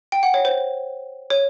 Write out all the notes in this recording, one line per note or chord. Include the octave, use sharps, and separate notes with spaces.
G5
F#5
C#5
C5
C#5